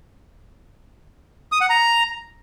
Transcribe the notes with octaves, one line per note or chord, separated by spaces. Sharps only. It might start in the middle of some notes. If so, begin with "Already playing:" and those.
D#6
F#5
A#5